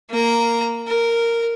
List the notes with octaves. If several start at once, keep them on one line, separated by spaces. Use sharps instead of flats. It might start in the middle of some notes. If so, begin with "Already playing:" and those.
A#3 A#5
A#4